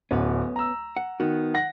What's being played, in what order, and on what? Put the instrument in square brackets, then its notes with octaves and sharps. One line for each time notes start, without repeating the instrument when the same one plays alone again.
[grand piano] D1 [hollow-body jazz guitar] B3 C#4
[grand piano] A#5 E6
[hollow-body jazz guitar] F#5
[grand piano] D#3 [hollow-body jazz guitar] B3 F#4
[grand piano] F#5 A#6